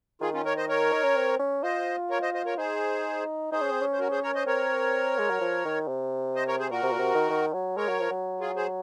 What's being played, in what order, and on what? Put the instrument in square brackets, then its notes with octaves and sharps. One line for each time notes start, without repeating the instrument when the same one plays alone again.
[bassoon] D#3 [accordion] F4 G#4
[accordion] C#4 F4
A#4 C#5
C5 D#5
A#4 C#5
[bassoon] D#4
C#4
C4
C#4
[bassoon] F4 [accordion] C5 D#5
[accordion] A#4 C#5
C5 D#5
C5 D#5
A#4 C#5
[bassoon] D#4 [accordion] G#4 C5
[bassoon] D#4 [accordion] G#4 C5
[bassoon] C#4
C4
C#4
[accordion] C5
F#4 A#4
G#4 C5
A#4 C#5
C5 D#5
[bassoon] C4 [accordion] A#4 C#5
[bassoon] G#3
F#3
F3
D#3
C3
[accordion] C5 D#5
A#4 C#5
G#4 C5
[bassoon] A#2 [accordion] F#4 A#4
[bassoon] C3
A#2
C3
D#3
D#3
F#3
[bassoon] G#3 [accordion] A#4 C#5
[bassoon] F#3
F3
F#3
[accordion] F4 G#4
G#4 C5